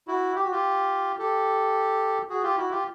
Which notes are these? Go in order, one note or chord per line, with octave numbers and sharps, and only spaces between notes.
E4 F#4
G4
F#4
F4 G4
G4 A4
F#4 G#4
F4 G4
E4 F#4
F4 G4